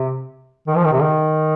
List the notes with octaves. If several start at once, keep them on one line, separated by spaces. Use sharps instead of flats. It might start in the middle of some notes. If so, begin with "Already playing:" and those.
Already playing: C3
D#3
F3
D#3
C3
D#3